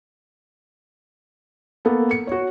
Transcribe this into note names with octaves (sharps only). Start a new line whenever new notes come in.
A#3 B3 A4
C#7
F#4 C#5